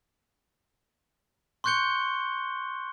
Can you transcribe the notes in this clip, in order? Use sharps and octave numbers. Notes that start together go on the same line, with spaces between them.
C6 C#6 F#6 G6 C#7 G7